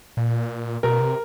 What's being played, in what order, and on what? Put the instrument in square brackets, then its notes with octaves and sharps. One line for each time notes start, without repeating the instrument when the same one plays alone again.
[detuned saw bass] A#2
[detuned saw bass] B2 [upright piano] A#4
[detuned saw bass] C3